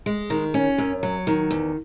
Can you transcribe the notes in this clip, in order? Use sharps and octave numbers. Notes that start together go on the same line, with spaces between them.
G#3
D#3
C#4
F#2
F#3
D#3
E2